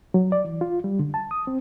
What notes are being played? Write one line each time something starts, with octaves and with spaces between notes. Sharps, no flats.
F#3
D5
E3
F4
G3
D3
A5
D#6
C4